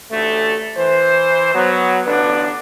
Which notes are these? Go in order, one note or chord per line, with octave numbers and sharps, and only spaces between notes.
A1 D2 A3
E3 C5
F#3 B3
A1 D3 B3 D4 B4